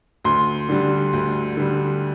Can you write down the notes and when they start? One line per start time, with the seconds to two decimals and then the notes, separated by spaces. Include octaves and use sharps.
0.25 D2 C6
0.69 D3 G3
1.13 D2
1.57 D3 G3